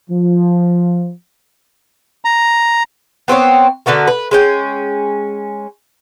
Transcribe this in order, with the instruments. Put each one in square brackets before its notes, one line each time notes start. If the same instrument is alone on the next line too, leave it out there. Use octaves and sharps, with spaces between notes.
[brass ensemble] F3
[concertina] A#5
[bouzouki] B3 C4 C5 C#5
D3 B3 F#4 A#4
B4
G#3 C#4 G5